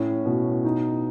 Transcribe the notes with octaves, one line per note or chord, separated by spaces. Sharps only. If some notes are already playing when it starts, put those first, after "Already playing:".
Already playing: A2 C#4
B2
D#4